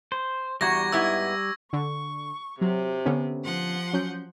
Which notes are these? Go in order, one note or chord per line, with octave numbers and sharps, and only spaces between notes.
C5
E2 G3 F#4 A#5 C#6 G#6 A#6
G#2 B3 E4 E6
D3 C#6
C3 F#3
D3 B3 C#4
F3 F#5 C6
F#3 C#4 G6